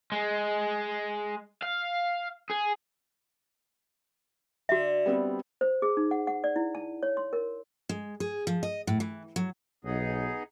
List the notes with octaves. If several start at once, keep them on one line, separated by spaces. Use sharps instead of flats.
G#3
F5
G#4
D3 F#4 E5
G3 B3 C4
C5
G#4
D#4
F#5
F#5
D5
E4
A5
C#5
C6
A#4
G#3
G#4
F3
D#5
A2
E3
F#3
B1 B3 D#4 G#4